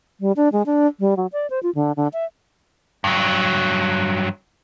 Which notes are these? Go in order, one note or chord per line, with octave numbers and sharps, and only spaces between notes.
G3
D4
G#3
D4
G3
F#3
D5
C5
F4
D3
D3
E5
G2 F#3